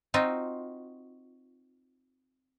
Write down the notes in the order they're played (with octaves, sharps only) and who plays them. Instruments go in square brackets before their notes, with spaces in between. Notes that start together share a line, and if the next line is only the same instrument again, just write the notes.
[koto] C4 D#4 F4 F#4